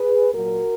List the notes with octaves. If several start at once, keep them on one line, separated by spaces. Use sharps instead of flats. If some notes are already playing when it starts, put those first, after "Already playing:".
Already playing: G#4 B4
A#2 F#3 F#4 A#4